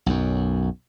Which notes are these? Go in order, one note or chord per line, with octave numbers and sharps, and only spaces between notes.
B1 F#2